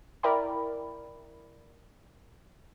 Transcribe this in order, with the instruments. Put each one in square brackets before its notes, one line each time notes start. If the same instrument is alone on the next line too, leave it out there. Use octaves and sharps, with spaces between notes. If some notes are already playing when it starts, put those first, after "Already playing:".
[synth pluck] E4 A#4 D5 E5 G5 B5